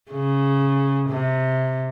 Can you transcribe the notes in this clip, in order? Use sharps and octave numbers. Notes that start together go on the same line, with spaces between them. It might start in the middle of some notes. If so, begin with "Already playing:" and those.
C#3
C3